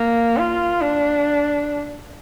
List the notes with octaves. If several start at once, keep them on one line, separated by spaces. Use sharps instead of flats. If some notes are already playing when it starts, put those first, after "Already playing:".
Already playing: A#3
F4
D4